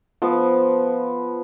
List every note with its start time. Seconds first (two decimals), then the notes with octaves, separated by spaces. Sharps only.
0.22 F3 B3